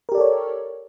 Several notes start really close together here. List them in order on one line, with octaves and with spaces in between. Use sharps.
A#4 G4 D5 A4 C#5